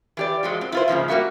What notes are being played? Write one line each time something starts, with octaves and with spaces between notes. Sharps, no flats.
E3 G4 D5
F3 F#3 G#3
C4
E4 F4 C5
G#2 C#3 F3 A#3
G3 A#3 D4 F#4 E5